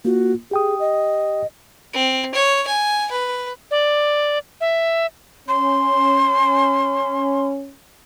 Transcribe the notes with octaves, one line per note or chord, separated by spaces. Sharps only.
A#3 F4 F#4
G4 G#4 G5 D#6
D#5
C4
C#5
G#5
B4
D5
E5
C#4 C6